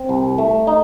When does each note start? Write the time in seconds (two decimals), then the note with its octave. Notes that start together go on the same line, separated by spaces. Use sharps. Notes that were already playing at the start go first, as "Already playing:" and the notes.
Already playing: C4
0.09 C2
0.38 A3
0.67 D#4